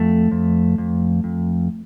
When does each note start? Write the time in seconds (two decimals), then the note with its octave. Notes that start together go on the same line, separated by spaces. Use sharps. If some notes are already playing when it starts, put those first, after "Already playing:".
Already playing: F2 A3
0.32 F2
0.78 F2
1.24 F2